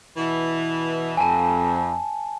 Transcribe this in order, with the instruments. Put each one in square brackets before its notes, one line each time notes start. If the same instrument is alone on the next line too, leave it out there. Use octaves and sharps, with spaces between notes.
[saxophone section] B2 E3
[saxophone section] F2 [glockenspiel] G#5 A5